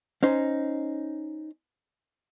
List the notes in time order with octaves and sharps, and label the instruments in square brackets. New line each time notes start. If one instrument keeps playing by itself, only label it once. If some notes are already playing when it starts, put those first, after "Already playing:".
[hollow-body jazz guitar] C#4 D#4 C5